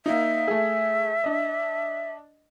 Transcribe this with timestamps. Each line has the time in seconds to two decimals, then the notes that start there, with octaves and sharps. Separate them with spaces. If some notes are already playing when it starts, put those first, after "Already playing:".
0.06 A#3 D#4 E5
0.48 A3 G#4
1.24 D4 D#5